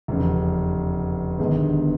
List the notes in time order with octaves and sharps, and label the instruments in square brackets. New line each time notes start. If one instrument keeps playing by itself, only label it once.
[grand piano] F1 E2 C#3
G1 G2 D#3 G#3 B3